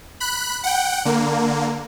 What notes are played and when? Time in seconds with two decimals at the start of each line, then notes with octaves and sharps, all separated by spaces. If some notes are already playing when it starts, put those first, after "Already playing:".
0.20 B5 F#6
0.64 F#5 G5
1.05 D3 A#3